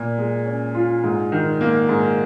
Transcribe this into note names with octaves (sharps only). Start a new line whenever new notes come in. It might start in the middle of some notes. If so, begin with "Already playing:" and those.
Already playing: A#2
G#3
C#4
F4
G#2
D#3
A#3
G#2